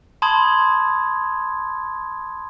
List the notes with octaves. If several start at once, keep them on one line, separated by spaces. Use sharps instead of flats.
A5 B5 C6 D#6 G#6